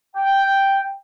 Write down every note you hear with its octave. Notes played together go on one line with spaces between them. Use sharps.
G5